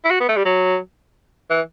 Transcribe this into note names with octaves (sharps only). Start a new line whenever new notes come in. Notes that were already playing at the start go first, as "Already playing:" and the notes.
E4
F#4
B3
A3
G3
F#3
E3